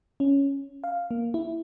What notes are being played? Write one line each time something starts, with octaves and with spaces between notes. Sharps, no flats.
C#4
F5
A#3
E4